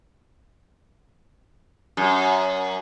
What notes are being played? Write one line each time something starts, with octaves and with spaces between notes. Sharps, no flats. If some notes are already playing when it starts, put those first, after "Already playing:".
F#2